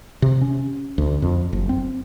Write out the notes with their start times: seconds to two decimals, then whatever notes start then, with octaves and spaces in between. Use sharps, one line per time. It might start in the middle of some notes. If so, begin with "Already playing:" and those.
0.22 C3
0.41 C#4
0.98 D2
1.22 F2
1.53 F#1
1.69 C4